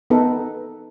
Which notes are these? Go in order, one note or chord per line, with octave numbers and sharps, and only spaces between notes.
B3 D#4 A4 B4